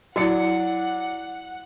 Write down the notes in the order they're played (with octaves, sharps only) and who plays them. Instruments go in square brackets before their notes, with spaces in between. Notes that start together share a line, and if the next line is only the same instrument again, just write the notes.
[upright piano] F#3 D5 C#7 [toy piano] E4 F#4 [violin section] F#5